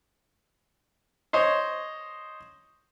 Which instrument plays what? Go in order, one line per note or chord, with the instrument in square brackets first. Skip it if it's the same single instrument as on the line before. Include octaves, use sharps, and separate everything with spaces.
[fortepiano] C5 C#5 D#5